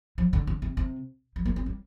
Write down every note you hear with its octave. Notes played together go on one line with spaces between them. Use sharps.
F3
D3
D3
C3
C3
F3
A#3
C4
G3